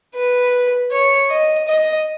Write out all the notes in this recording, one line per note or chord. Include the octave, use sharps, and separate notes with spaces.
B4
C#5
D#5
D#5